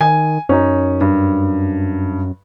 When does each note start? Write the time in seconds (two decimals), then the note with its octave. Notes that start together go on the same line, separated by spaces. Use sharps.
0.01 D#3 G#5
0.49 F#2 C#4 D#4
1.01 G2